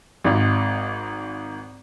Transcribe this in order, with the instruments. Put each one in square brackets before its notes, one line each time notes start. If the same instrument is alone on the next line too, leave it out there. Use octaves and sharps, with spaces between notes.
[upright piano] G#1 G#2